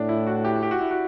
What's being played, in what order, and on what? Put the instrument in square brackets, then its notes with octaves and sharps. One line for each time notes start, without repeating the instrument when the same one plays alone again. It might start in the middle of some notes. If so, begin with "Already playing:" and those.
Already playing: [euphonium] A2 [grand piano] D4
[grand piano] E4
F#4
G4
G4
F#4
E4
F#4